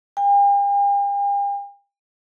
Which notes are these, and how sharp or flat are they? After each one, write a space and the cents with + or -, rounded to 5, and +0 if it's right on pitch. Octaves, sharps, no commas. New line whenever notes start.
G5 +45